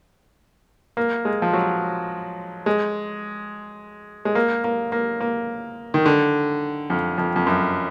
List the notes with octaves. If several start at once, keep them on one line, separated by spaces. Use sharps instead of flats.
A#3
G#3
F3
F#3
G#3
G#3
A#3
A#3
A#3
A#3
D#3
D3
F2
F2
F2
F#2